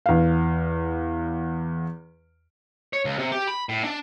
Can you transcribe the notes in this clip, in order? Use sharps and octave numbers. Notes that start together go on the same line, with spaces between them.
E2 F5
C#5
C#2
C3
G4
B5
A2
D4